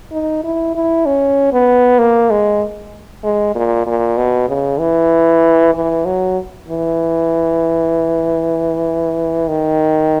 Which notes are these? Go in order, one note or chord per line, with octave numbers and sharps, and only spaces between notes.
D#4
E4
E4
C#4
B3
A#3
G#3
G#3
A#2
A#2
B2
C#3
E3
E3
F#3
E3
D#3